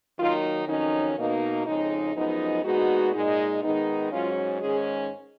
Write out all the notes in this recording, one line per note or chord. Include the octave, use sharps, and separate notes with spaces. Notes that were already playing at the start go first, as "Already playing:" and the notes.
D#3 F#3 A#3 D#4 F4
F2 D#3 F#3 C#4 D#4
B2 A#3 D#4
F2 C#3 G#3 D#4
F#2 F3 G#3 B3 D#4
A#2 G#3 B3 D#4 F#4
A#2 G#3 D#4
D#3 G#3 B3 D#4
G#2 F#3 C#4 F4
G#2 D#3 G#3 C#4 G#4